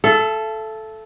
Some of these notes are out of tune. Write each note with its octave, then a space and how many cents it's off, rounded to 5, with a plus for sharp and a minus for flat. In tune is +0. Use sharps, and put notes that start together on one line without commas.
A4 -10 E5 +40